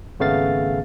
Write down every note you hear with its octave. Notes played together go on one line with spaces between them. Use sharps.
G#1 C#3 A3 B3 F5 A6